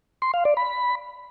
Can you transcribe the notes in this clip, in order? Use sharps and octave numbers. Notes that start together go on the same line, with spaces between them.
C6
F5
D5
B5